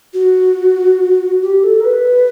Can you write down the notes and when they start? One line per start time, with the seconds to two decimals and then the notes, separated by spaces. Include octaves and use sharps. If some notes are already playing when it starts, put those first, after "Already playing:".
0.14 F#4
1.42 G4
1.63 A4
1.80 A#4
1.85 B4